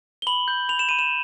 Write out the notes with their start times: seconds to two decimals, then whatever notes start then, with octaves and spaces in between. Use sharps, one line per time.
0.22 G7
0.27 B5 F#7
0.48 G6
0.69 B5 F7
0.79 E7
0.89 B5 D#7
0.99 E7